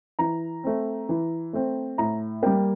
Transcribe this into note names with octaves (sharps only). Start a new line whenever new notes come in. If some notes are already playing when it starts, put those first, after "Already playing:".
E3 A#5
A3 C4
E3
A3 C4
A2 A#5
G3 A#3 G5